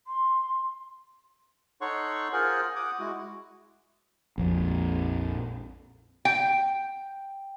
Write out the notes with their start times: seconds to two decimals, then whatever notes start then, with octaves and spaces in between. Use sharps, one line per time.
0.07 C6
1.81 D#4 A4 C#5 F#5 C6 C#6
2.33 F4 G#4 A#4 C5 F#5 G#5
2.76 F#5 D6 D#6
3.00 G#3 E4 F#4
4.38 A#1 F2
6.25 G5